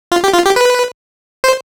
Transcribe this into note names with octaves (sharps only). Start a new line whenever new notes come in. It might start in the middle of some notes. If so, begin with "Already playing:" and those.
F4
G4
F4
G4
B4
C5